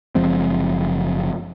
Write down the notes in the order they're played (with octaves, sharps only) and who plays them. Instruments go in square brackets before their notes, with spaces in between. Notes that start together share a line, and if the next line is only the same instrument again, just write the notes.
[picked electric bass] F#1 F3 G#3 C4